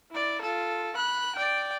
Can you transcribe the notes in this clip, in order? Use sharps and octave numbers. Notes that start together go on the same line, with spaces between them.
E4 D5
F4 A4
B5 F#6
D5 G5